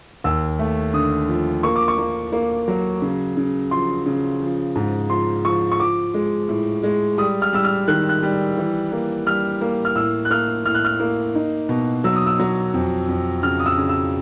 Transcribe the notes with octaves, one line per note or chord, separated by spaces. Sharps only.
D#2 E6
A3
D3 D#6
F3
A#3 C#6
D6
C#6
A#3
A#3
F#3
C#3
C#3
F3 C6
C#3
F3
G#2
F3 C6
F3 C#6
C#6
F3 D6
G#3
A2
G#3
G3 D#6
F6
G3 E6
F6
D#3 F#6
F#6
G3
E3
A#3
G3 F6
A#3
F6
A2 E6
F#6
A#3 F6
A2 F6
F#6
F6
A#3
D#4
B2
F#3 E6
D#6
E6
F#3
F2
F2
C#3 F6
D#6
E6
C#3
E6